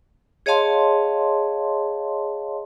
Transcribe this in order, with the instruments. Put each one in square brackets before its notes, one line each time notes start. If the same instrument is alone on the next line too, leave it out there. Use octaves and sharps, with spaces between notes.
[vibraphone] G#4 C#5 D#5 F5 A5 C6